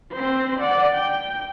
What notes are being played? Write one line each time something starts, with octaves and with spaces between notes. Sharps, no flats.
C4 C5
D5 F#5
G5